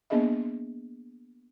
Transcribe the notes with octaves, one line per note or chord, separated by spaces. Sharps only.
A#3 B3 D4 G#4 D#5 E5